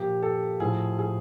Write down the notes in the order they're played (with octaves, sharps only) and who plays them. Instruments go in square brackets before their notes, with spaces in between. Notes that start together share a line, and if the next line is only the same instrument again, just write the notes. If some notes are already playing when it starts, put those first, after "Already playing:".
Already playing: [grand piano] A#2 F3 G4
A4
A2 F3 G#4
G#4